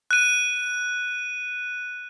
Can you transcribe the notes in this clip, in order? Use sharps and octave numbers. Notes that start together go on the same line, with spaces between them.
F#6 D#7